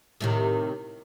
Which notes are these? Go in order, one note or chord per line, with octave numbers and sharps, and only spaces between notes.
A2 C3 D#3